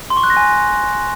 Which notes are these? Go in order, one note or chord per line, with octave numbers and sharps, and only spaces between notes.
C6
C#6
F#6
A#6
G#5